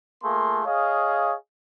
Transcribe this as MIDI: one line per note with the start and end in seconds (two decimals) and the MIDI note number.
0.23 0.63 57
0.23 0.63 58
0.23 0.63 65
0.23 0.63 68
0.23 0.63 84
0.65 1.34 68
0.65 1.34 73
0.65 1.34 75
0.65 1.34 77